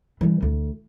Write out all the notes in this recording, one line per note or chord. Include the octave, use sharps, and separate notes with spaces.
E3 G3
D2